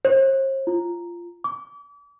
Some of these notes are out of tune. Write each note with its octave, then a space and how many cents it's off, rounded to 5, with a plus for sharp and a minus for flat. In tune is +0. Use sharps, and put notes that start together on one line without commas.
C5 +45
F4 -15
D6 -40